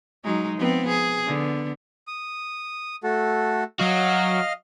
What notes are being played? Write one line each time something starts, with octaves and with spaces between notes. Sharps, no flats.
F#3 G#3 D#4
F3 B3 C4
G#4
D3 B3
D#6
A3 F#4 A4
F#3 F#4 D#5 F5 F6